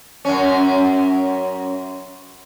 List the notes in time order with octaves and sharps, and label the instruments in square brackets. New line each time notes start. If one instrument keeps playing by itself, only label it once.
[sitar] F#2 C#4